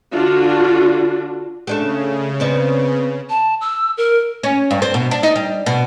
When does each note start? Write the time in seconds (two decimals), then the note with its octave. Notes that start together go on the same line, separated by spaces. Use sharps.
0.15 D3 D4 F4 F#4
1.67 C#3 A3 D4 G4
2.40 B3 C4 D5
3.30 A5
3.61 E6
3.98 A#4
4.43 C#4
4.71 G2
4.82 C4
4.94 B2
5.11 D4
5.23 D#4
5.36 G3
5.66 B2